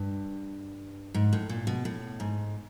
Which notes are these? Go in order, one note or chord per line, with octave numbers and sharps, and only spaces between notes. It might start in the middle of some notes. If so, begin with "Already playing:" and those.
Already playing: G2
G#2
A2
A#2
B2
A2
G#2